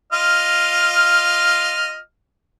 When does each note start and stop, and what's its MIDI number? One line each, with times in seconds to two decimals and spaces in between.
0.13 1.99 65
0.13 1.99 75
0.13 1.99 89